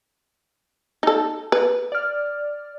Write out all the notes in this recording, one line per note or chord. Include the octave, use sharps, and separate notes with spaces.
D#4 A4
B4
D5 F6